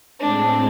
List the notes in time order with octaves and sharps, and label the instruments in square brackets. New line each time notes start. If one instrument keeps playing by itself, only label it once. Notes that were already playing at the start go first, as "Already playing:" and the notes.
[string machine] A2 G#3 C4 [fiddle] D4